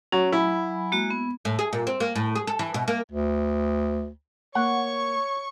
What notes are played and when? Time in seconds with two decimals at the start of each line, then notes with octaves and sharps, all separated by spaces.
0.12 F#3 C#4
0.33 F#3 E4 G#5 B5
0.92 G#3 A#3 F#4
1.10 B3
1.45 A2
1.59 G#4
1.73 A#2
1.87 C4
2.00 A#3
2.15 A2
2.35 G#4
2.47 A4
2.59 E3
2.74 B2
2.88 A#3
3.12 D2
4.55 A#3 C#5 F#5 C#6